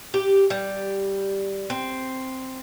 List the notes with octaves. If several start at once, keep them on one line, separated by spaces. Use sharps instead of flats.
G4
G3
C4